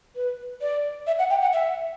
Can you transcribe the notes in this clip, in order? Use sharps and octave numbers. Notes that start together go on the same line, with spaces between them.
B4
D5
E5
F#5
G5
F#5
E5